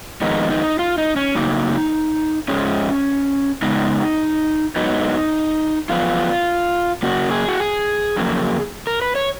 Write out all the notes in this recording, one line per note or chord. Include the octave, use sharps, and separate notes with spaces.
F2 D#3 G#3 B3 D#4
D#4
F4
D#4
C#4
F#2 C#3 F#3 A#3 D#4
G#2 F3 G#3 C#4
C#3 G#3 B3 D#4
G#2 F#3 B3 D#4
F#2 F3 B3 F4
C#3 F#3 A#3 F#4
G#4
F#4
G#4
F2 C#3 F#3 A#3
A#4
B4
C#5